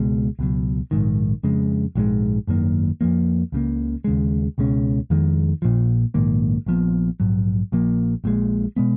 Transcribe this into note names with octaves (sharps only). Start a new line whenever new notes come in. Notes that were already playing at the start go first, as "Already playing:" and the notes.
Already playing: C#2 B2 G#3
C#2 B2 F#3
A#1 G#2 D#3
F2 C#3 G#3
A#1 G#2 F3 G#3
G#1 F#2 D#3 A#3
F2 F3 A#3
C#2 C#3 F#3 A#3
D#2 C#3 G#3
C#2 B2 G#3 C#4
F2 D#3 G#3
A#1 A#2 F3
A#1 G#2 D#3 A#3
A#1 A#2 F3 B3
A#1 G#2 F#3
A#1 A#2 F3 A#3
A#1 A#2 G#3
B2 G#3 B3